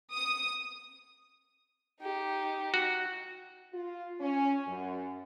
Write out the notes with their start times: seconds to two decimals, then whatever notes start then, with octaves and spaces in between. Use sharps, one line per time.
0.13 D#6
2.00 D#4 G4
2.74 F#4
3.72 F4
4.19 C#4
4.67 F#2